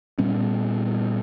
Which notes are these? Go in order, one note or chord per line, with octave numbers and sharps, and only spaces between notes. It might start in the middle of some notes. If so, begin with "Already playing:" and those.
A#2 G3 B3 C#4